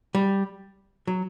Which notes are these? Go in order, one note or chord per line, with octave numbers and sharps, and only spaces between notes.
G3
F#3